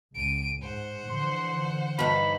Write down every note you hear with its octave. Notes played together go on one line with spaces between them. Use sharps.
C#2 D7 D#7
G#2 C5 F#5
D3 E3 F3 C6
G2 D#4 B5